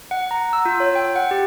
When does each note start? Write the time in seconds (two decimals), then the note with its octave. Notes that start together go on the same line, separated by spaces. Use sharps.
0.11 F#5
0.31 A#5
0.53 E6
0.65 F4
0.80 C#5
0.95 G5
1.16 F#5
1.31 G4